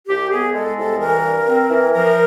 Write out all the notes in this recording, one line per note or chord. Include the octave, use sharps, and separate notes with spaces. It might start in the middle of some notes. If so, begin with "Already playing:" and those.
C2 G4
B3 G#4
G#3 A4
C2 A4
E3 A#4
G2
C4
E3
F3 A#4